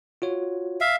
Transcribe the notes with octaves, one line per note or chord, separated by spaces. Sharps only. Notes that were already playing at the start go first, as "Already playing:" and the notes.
F4 F#4 C#5
E5 F5